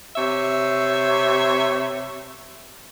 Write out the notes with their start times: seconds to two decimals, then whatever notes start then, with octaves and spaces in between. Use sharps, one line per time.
0.16 C3 C#5 E5